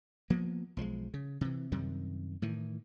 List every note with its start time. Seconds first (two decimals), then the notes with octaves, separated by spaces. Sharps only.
0.30 F3 A#3 B3
0.77 B1 F3 F#3 G#3
1.14 C#3
1.41 C3 E3
1.72 F#2 C3 D#3 G3
2.42 A2 D#3 E3